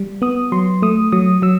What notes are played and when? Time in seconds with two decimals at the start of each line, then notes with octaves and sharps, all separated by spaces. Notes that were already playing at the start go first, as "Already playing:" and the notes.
Already playing: G3
0.22 B3 D#6
0.52 F#3 C6
0.82 A3 D#6
1.12 F#3 D#6
1.42 F#3 E6